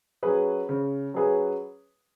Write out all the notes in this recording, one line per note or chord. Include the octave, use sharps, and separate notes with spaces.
F#3 C#4 G#4 B4
C#3
F#3 C#4 G#4 B4